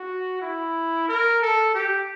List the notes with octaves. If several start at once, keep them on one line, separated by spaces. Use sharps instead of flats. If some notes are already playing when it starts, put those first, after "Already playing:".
Already playing: F#4
E4
A#4
A4
G4